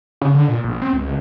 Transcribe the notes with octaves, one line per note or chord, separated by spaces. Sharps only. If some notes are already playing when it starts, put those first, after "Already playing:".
C#3
D3
A#2
A#1
C4
C#2
C#2